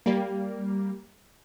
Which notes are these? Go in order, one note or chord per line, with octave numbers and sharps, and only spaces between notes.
G3 A#3